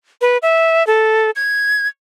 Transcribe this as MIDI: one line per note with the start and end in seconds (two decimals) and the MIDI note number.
0.21 0.38 71
0.42 0.86 76
0.87 1.31 69
1.36 1.88 92